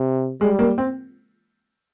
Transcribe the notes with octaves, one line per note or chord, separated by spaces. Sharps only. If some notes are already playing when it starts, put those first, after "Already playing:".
Already playing: C3
G3 G#3
A#3
C4